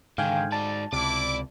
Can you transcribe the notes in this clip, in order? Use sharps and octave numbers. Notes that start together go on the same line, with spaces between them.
G#2 D3 D#3 F5 G5 G#5
F#4 D5 A5
C#2 C3 E4 D5 D6